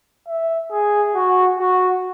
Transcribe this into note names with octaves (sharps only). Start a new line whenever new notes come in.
E5
G#4
F#4
F#4